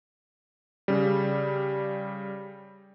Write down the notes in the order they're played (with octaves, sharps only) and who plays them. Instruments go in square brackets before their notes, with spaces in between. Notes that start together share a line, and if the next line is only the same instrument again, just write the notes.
[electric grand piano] C#3 G3